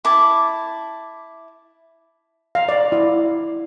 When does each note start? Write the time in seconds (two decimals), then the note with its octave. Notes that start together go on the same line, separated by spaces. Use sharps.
0.05 E4 A5 D6
2.55 F5
2.69 D5
2.92 E4